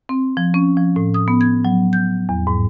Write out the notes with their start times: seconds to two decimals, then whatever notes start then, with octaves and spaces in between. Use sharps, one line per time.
0.09 C4
0.37 F3
0.54 C#4
0.77 F3
0.96 A2
1.14 D#6
1.28 B3
1.41 G#6
1.65 F#3
1.93 G6
2.29 E2
2.47 G#2